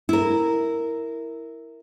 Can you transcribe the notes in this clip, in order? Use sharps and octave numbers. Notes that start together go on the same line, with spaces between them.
E4 A#4